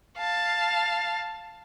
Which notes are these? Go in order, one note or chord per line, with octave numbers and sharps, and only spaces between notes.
F5 A5